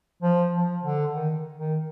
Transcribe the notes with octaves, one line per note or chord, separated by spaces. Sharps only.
F3
F3
D3
D#3
D#3